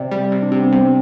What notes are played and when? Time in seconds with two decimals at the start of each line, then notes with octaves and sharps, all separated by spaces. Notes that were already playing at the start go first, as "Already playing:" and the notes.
Already playing: C3 D5
0.11 G3
0.32 C3
0.42 D4
0.52 C3 C4
0.62 B3
0.72 C3 C4